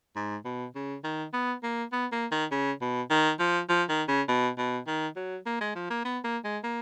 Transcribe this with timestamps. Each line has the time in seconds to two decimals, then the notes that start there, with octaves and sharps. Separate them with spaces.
0.16 G#2
0.45 B2
0.75 C#3
1.04 D#3
1.33 B3
1.63 A#3
1.93 B3
2.12 A#3
2.31 D#3
2.51 C#3
2.81 B2
3.10 D#3
3.39 F3
3.69 F3
3.89 D#3
4.08 C#3
4.28 B2
4.58 B2
4.87 D#3
5.16 F#3
5.46 A#3
5.61 G#3
5.75 F3
5.90 A#3
6.05 B3
6.24 A#3
6.44 G#3
6.64 A#3